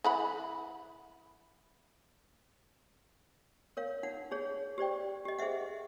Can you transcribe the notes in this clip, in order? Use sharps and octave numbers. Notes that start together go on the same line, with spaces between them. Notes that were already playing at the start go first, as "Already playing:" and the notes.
E3 F#5 B5
A#4 C#5 F5
D#4 F#5
D#4 G#4 C#5
G4 C5 D5 G5
G4 D#5
G#4 C5 D#5 E5 F#5